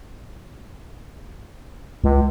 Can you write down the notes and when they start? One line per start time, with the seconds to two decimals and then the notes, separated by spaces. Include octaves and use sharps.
2.04 C#2